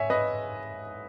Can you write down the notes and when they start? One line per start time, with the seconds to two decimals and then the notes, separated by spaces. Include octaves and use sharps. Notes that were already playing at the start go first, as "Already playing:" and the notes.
Already playing: G#2 C#5 E5 G#5
0.10 B4 D#5